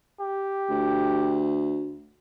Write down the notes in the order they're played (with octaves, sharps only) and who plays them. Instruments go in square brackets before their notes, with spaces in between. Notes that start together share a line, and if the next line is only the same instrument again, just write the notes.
[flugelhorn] G4
[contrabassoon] D2